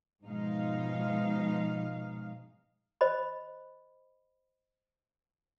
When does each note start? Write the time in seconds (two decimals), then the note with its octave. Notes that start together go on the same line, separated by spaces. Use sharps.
0.25 G#2 B2 F3 G#3 D#4 F5
3.01 C5 D#5 B5